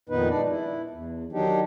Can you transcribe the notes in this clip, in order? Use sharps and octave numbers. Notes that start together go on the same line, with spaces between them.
F2 A#2 D#3 B3 D#4 B4
G#3 D4 D#4 D5
E4
E2
D#3 F#3 D4 D#4 G4